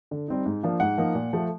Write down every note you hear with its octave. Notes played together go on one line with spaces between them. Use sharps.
D3
G3 C4 D#4
G#2
F3 A#3 D4 F4
G#2 F#5
F3 A#3 D#4
A#2
F3 A3